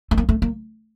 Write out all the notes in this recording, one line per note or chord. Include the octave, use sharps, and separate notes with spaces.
A3
A#3
A3
A#3